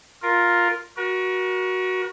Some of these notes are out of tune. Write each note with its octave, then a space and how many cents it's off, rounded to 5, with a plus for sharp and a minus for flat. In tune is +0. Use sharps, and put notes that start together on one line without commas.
F4 +5 A#4 +0
F#4 +0 A#4 +40